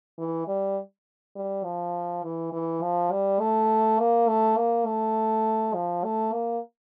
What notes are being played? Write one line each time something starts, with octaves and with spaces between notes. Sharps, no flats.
E3
G3
G3
F3
E3
E3
F3
G3
A3
A#3
A3
A#3
A3
F3
A3
A#3